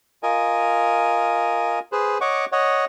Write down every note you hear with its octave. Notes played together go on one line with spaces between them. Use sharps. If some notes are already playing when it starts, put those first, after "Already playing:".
F4 A#4 D#5 G#5
G#4 B4 C5
C#5 D#5 F#5 C#6 D6
C#5 D#5 F#5